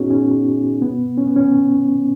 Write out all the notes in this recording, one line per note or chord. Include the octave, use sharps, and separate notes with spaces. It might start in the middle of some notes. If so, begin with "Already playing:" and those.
Already playing: A#2 B3 C#4 D#4 F#4 G#4
C#4
B2 B3
C#4
B3
C#4